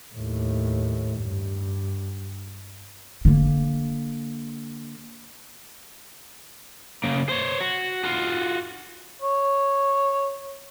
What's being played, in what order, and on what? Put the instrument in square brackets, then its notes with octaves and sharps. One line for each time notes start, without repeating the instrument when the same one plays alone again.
[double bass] D#2 A2
G2
[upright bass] D3 A#3
[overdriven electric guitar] C#3 A#3
C5 C#5
F#4
F4 F#4
[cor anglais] C#5